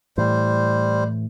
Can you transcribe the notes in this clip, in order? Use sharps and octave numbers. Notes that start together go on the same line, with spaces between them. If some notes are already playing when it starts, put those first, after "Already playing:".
A2 E3 G3 C5